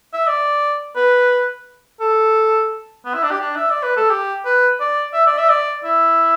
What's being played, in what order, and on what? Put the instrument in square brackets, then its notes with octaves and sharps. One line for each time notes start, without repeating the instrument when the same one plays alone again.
[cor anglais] E5
D5
B4
A4
B3
E4
D4
G4
D4
E5
D5
B4
A4
G4
B4
D5
E5
D5
E5
D5
E4